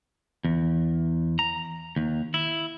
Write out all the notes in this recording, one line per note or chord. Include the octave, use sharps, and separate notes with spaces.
E2
A#5
D#2
E4